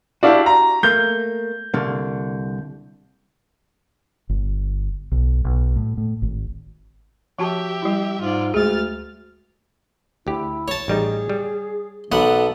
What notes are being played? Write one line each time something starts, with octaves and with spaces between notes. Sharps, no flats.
D4 E4 F#4 G4 F5
A#5
A3 A#3 G6
C2 D3 A#3
G1
B1
B1
A2
A2
G#1
F3 F#4 G4 E5 A5
G3 E4
G#2 F4 D5
D2 G#3 G#4 F6 A6
D2 E4 G4
C#5 A5
A1 G3 D#4 G#4
G3
B1 B3 A4 F#5